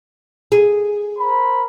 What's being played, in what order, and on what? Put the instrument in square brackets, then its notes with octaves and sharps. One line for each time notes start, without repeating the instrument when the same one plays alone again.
[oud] G#4
[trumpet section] A#4 C5 B5